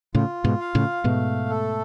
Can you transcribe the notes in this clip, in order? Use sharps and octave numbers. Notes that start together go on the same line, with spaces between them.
A2 C#3 F4
G#2 B2
F5
A2 C#3
G#2 B2 A3
A4